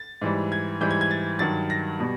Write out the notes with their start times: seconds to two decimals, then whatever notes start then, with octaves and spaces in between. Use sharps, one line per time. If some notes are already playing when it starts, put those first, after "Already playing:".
Already playing: A6
0.22 G#2 E3 G3
0.52 G#6
0.81 G#2 E3 G3 G6
0.91 G#6
1.01 G#6
1.11 A6
1.39 G2 D#3 F#3 A6
1.70 A#6
1.99 B2 G3